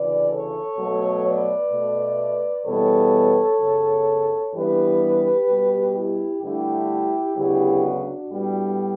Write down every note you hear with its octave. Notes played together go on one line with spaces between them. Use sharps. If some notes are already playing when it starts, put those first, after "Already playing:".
Already playing: D2 C#3 E3 B4 D5
A4 C#5
B2 F#3 A3
B4 D5
B2 A3
E2 B2 G3 B3 A4 C#5
F#2 C#3 F#3 B3
G2 E3 G3 B3 G4 B4
B2 G3 B3
E4 G4
G2 D3 A3 E4 G4
D2 C#3 F#3 B3 E4 G4
D4 F#4
A2 G3 B3